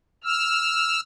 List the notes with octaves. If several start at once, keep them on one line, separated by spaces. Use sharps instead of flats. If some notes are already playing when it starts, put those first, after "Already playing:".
E6 F6